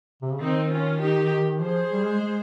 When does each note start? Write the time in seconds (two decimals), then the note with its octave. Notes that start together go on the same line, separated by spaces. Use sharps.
0.22 C3
0.31 C#3
0.41 D#3 C4 D#4
0.71 C#4 F4
1.01 D#4 G4
1.61 F3 G#4 C5
1.91 G3
2.06 G#3
2.21 G#3